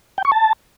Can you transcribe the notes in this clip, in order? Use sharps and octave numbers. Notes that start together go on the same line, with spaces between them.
G5
C#6
A5